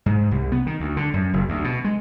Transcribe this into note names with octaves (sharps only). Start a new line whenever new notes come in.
G#2
C2
B3
D#3
D2
D3
F#2
F#1
D2
B2
G#3